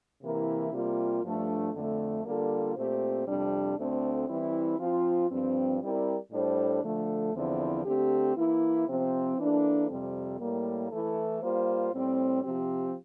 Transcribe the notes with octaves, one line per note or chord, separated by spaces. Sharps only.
C3 E3 A#3 E4 A#4
C3 G3 A#3 F4
G2 F3 A3 D4
F2 D3 A3
D3 G3 A#3 F4 A4
A#2 A3 C4 G4 C5
F2 C3 G3 D4
D2 D3 A3 C4
E3 G3 C4 E4
F3 C4 F4
G2 F3 C4
G3 C4 E4 A#4 D5
A2 G3 D4 A4 C5
D3 F3 A3
E2 D3 F3 C4 E4
D3 A3 C4 G4
E3 A#3 E4
C3 F3 C4
E3 A#3 D4 A4
F2 C3 G3 C4
A2 G3 A#3
E3 A3 E4 A4
G3 A#3 F4 C5
A2 G3 C4
C3 F3 C4 G4